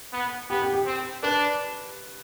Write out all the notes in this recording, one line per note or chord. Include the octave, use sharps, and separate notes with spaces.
B3
B3 G4
G4
G4
C4
D4 B4